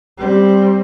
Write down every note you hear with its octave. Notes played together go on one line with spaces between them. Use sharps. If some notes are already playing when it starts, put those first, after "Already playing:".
G3 C4